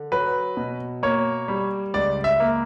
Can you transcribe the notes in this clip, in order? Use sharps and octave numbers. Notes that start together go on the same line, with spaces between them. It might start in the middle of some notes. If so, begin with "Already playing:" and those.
Already playing: D3
F#3 B4
B2
A#3 C#5
G3
C#2 D5
E5
A#3